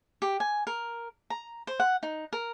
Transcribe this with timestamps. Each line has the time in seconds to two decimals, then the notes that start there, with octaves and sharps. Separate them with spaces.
0.22 G4
0.40 G#5
0.67 A#4
1.30 A#5
1.67 C5
1.80 F#5
2.03 D#4
2.33 A#4